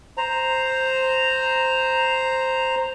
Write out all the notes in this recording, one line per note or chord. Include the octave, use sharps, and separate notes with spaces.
C5 A#5